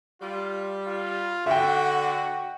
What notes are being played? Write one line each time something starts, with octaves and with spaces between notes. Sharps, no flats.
G3 F4
F4
D3 F#4 E5 G5